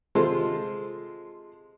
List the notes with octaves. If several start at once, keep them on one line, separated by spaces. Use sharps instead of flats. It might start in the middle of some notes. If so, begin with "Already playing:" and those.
C3 G#3 F4 A4 C5 C6